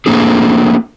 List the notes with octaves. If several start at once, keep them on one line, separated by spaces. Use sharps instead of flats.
A3 A#3 C4 D4 G#4